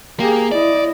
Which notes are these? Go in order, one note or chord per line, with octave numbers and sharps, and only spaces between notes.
A#3 G4 G#4
E4 D5 D#5